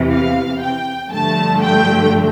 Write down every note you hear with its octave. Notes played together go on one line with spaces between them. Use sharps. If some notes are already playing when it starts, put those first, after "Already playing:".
Already playing: E2 C3 E3
F5
G5
G2 D3 F3 A3 A5
G5